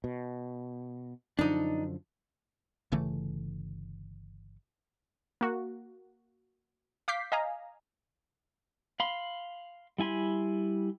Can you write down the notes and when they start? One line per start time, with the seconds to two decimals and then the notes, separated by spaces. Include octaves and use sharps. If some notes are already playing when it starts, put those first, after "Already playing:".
0.04 B2
1.39 F#2 D3 F3 D4 D#4
2.92 G1 C#3 E3 A3
5.41 A#3 F#4
7.08 F5 D6 G6 B6 C7
7.32 D#5 F5 G#5 A#5
9.00 F5 B5 C6
9.98 G3 E4 G#5 B5 C6